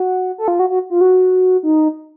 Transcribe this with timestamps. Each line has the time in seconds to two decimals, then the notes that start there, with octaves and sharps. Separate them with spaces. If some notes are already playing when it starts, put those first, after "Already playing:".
Already playing: F#4
0.38 A4
0.48 F4
0.59 F#4
0.70 F#4
0.90 F4
1.01 F#4
1.63 D#4